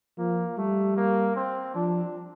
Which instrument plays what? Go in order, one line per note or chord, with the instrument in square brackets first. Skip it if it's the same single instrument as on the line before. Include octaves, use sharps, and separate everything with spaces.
[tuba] F3 [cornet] A#3
[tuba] G3 [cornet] A3
[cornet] A#3
C4
[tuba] F3 [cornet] D4